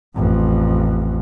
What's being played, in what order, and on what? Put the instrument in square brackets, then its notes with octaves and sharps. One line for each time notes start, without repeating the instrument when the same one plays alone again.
[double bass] A1 F2